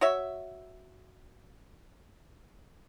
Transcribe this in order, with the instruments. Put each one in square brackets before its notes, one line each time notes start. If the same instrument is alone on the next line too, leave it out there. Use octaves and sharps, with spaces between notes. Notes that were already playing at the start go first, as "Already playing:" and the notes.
[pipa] F#4 C#5 E5